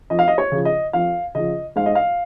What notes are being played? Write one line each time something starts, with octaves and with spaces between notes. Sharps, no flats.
F2 D#5
F5
D#5
C#5
C#3 F3
D#5
F2 F5
C#3 F3 D#5
G#2 F5
D#5
F5